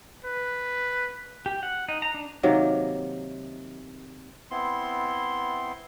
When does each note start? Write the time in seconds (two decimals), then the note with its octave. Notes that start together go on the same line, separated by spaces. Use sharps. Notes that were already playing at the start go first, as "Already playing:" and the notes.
0.24 B4
1.46 G4
1.63 F#5
1.89 D#4
2.02 A#5
2.14 D4
2.43 C3 D#3 F#3 A#3
4.51 B3 C4 E4 C6